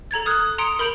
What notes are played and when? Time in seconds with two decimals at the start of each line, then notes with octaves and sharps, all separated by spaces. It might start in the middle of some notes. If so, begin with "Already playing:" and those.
0.11 A4 A#5 G#6 A6
0.26 D#6 F6 F#6 G#6
0.58 A#5 C6 D#6 C#7 D7
0.79 A#4 B5 G6 D7 F7 F#7